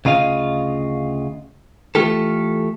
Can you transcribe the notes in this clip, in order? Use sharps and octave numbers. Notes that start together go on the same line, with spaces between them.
D2 C#3 F4 D#5 F5
E3 A3 F4 G4 A4